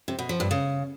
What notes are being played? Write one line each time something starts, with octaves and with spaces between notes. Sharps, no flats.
C3
B2
F3
G2
C#3